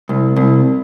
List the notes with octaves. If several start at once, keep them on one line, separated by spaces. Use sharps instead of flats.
C2
C2